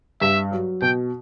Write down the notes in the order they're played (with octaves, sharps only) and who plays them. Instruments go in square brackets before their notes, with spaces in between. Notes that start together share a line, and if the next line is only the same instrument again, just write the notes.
[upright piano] G2 [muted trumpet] E5
[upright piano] F#3
[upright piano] B2 [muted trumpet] G5